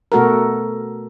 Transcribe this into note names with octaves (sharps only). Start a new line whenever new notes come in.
B2 A3 F#4 A4 A#4